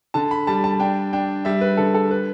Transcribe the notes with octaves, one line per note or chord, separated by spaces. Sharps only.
D3 A5
B5
G3 A5
A5
D4 G5
D4 G5
G3 E5
B4
D3 A4
A4
B4